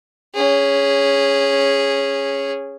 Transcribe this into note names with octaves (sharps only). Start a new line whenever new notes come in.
C#4 G#4